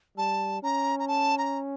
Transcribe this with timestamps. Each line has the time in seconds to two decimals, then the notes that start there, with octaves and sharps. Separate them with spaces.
0.17 G3 A5
0.63 C#4 A#5
0.99 A#5
1.08 A5
1.38 A#5